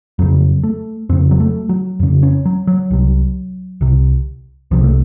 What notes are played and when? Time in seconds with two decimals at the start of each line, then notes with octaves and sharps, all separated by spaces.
0.19 F2 C#3 F#3
0.63 A3
1.09 F2 C#3 C4
1.31 F#3
1.40 A3
1.69 F#3
2.00 F2 C#3
2.23 C#4
2.45 F#3
2.67 F#3
2.91 C2 C3
3.81 C2 C3
4.71 C2 C3 F3
4.84 A3